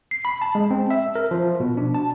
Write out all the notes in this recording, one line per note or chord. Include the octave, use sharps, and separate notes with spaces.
C7
B5
A5
G#3
C4
E5
A#4
F3
B2
D4
A5